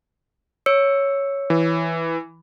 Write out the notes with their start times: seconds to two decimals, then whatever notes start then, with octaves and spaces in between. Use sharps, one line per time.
0.66 C#5 E6 C#7
1.50 E3